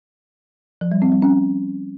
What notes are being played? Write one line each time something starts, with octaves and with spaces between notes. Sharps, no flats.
F3
G3
C4
G3
C#4